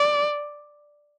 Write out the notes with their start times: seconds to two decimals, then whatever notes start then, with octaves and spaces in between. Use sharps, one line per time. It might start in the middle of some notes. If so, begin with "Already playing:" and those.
Already playing: D5